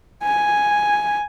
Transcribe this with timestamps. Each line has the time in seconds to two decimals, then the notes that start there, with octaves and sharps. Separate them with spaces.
0.23 G#5